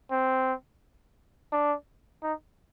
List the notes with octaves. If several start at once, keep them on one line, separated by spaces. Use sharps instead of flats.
C4
D4
D#4